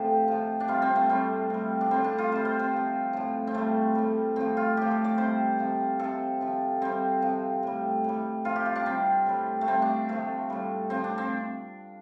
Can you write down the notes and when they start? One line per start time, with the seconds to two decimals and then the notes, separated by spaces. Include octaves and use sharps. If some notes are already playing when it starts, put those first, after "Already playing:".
Already playing: A2 C3 F3 G4 A4 C5
0.28 C3 F3
0.60 D4
0.68 C3 G3 F4
0.82 C4
0.96 A3
1.09 A2 G3 C4
1.50 C3 G3
1.81 D4
1.91 A2 G3 C4
2.04 D4
2.18 F4
2.32 C3 G3 C5
2.45 C5
2.59 C4
2.73 C3 F3
3.13 A2 F3
3.47 C4
3.54 A2 G3 A3
3.95 A2 G3
4.36 A2 F3 C4
4.57 F4
4.77 A2 F3 G4
4.91 A4
5.04 D5
5.18 C3 G3 C5
5.59 C3 F3
5.99 C3 F3 A4
6.41 C3 F3
6.81 C3 G3 C4
7.22 C3 F3
7.63 A2 G3
8.04 A2 G3
8.45 C3 F3 F4
8.56 G4
8.66 F4
8.75 D4
8.86 C3 G3 C4
9.27 A2 G3
9.61 A3
9.67 C3 G3 C4
9.82 D4
10.09 C3 F3 A3
10.50 A2 G3
10.90 A2 F3 C4
11.04 D4
11.18 C4